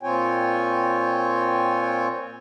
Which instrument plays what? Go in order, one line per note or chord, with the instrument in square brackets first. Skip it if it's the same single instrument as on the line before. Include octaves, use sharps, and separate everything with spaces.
[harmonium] A#2 C4 F4 C#5 G5 G#5